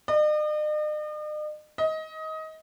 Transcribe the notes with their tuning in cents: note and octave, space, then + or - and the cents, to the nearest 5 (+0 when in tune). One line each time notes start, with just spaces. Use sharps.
D#5 -45
D#5 +20